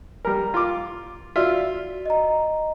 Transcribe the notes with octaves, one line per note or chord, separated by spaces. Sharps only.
G3 A#4
F4 D6
F4 F#4 D5 E5
D#5 A#5